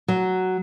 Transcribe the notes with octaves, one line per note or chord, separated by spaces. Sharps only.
F#3